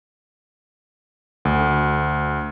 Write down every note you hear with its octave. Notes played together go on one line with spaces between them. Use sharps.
D2